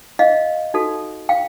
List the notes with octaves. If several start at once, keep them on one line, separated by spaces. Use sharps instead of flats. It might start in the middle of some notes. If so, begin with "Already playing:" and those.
D#5 F5
D#4 F#4 A4
F5 G5